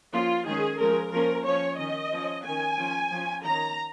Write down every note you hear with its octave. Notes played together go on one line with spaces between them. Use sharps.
F3 A#3 C#4 F4
D#3 G#3 C#4 G#4
F3 G#3 C#4 A#4
F3 A#3 C#4 A#4
F3 C#4 C#5
D#3 C#4 D#5
F3 C#4
D#3 C#4 G#5
F3 C#4
F3 C#4
D#3 C#4 A#5